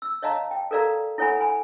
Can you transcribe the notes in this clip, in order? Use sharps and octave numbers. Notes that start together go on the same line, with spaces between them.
E6
C#5 D#5 F5 A5 A#5
G5
A4 A#4 D5 F5 A#5
E4 A4 C#5 F#5 G#5 B5
G#5 B5